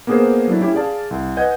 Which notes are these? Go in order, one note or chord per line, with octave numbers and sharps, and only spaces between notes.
A#3 B3 D4 G#4 A#4 C5
F#3 A3 D4 E4
C#4 E4 G4
G#4 D5 F5 A5
C2
B4 D#5 F#5 G#5 G6 G#6